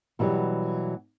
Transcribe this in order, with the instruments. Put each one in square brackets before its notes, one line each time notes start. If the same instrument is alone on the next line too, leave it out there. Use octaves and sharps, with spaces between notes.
[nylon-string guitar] B2 E3 F#3 G3 B3